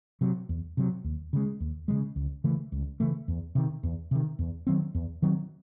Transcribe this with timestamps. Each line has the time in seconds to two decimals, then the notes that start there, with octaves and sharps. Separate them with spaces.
0.21 C3 F#3
0.49 E2
0.77 C3 F#3
1.04 D#2
1.33 C#3 E3 G#3
1.60 D#2
1.88 C#3 E3 G#3
2.16 C#2
2.44 C#3 E3 A3
2.72 C#2
3.00 C#3 E3 A3
3.28 E2
3.55 C3 D#3
3.83 E2
4.11 C3 D#3
4.39 E2
4.67 D#3 F#3 C4
4.95 E2
5.22 D#3 F#3 C4